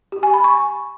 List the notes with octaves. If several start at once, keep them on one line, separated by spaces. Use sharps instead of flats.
G4
G#5
B5
C#6